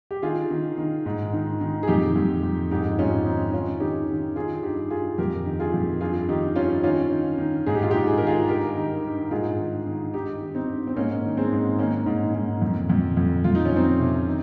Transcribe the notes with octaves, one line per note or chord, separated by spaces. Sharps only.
G4
D#3 F4 G#4
D#3
D#3
G#2
D#3
D#3
G#4
F2 D#4 G4
F2
F2
G#2 D#4 G4
G#2 C#4 F4
D#3 C4 D#4
D#4
D#3 C#4 F4
D#3 D#4 G4
D#3
D#3 F4 G#4
G2 D#4 G4
G2 F4 G#4
F2 G4 A#4
D#3
F4 G#4
F2
G2 F4 G#4
D#3 D#4 G4
G2 C#4 F4
D#3 C#4 F4
D#3
D#3
G#2 G#4
G4
F4
G#2 D#4 G4
G#4
D#3 A#4
F4 G#4
G2 G4 A#4
D#3
G2
G#2 F4 G#4
D#3
D#3
G2 D#4 G4
D#3
C4 D#4
G2
C4
G#2 A#3 C#4
D#3
G#3 C4
G#2
D#3 A#3 C#4
G#2
G#2
F2
F2
F2
F2 F4
D#4
C#4
F2 C4 D#4
C3
D#3